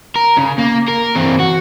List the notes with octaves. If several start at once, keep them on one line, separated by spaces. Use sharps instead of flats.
A#4
C#3
A#3
A#4
E3 C4
F#4